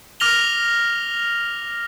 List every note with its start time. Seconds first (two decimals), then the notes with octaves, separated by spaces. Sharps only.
0.20 D6 F6 A#6 F7 G7